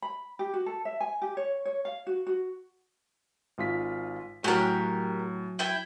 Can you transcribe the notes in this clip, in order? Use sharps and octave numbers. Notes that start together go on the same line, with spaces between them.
B5
G4
F#4
A4
E5
G#5
G4
C#5
C#5
F5
F#4
F#4
G#1 F4 B6
A2 F#3 F#4 G4 A#4 G#5
E4 G5